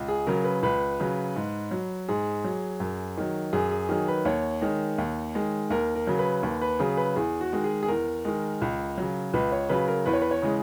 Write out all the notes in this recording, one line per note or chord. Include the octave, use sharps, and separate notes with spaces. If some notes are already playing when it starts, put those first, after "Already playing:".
Already playing: C#2
G#4
C#3 F#3 A#4
B4
C#2 B4
C#3 F#3
G#2
F#3
G#2 G#4
F#3
F#2
D#3 F#3
F#2 G#4
G#4
D#3 F#3 G#4
B4
D#2 C#5
D#3 G#3
D#2
D#3 G#3
D#2 A#4
A#4
C#3 F#3
B4
D#2 B4
B4
C#3 F#3 G#4
B4
E2 G#4
F#4
D#3 G#3
G#4
G#4
E2 A#4
D#3 G#3
C#2
C#3 F#3
C#2 B4
C#5
C#3 F#3 B4
A#4
E2 B4
C#5
B4
C#5
C#3 E3 G#3